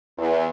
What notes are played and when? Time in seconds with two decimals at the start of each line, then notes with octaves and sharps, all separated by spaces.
0.18 E2